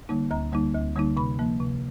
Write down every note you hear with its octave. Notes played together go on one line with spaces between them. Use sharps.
D3 G3 A#3 D#4
D2 A#5
D3 G3 A#3 D#4
D2
D3 G3 A#3 D#4
C3 B5
F3 A#3
C3